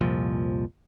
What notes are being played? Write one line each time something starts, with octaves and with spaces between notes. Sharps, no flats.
C2 F2 A#2 F3